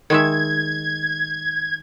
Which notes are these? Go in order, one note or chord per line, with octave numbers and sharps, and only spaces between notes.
D#3 G#3 E5 G#6